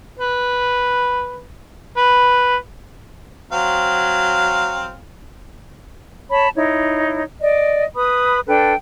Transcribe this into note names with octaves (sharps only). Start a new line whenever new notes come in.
B4
B4
F#3 C4 F5
C#5 A5 B5
D#4 E4 C#5
D5 D#5
B4 B5 D#6
D4 A4 B4 G5